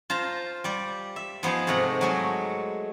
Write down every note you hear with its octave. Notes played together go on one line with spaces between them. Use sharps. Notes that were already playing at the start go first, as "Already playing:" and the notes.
F4 C5 A5 A#5
G3 D5
E5
F3 B3 D#4 G#4 F5
G#2 C3 A3 F#5 A#5
F#3 G#3 A3